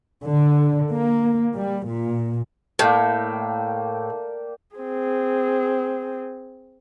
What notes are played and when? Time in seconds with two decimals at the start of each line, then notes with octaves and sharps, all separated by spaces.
0.24 D3
0.91 A#3
1.53 G3
1.87 A#2
2.79 A2 A#3 D5 G5
4.76 C4 G#4